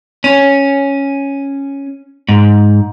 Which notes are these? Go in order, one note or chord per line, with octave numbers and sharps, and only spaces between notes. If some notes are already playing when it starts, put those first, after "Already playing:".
C#4
G#2